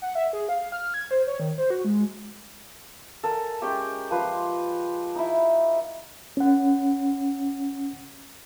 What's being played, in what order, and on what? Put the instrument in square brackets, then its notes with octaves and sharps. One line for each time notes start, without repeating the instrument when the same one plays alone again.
[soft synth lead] F#5
E5
G#4
F5
F6
G#6
C5
C#5
D#3
C5
F#4
G#3
[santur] A4 A#4 G#5
G#3 C#4 G4 G5
F3 B4 C6
D#4 E4
[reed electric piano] C#4 F#5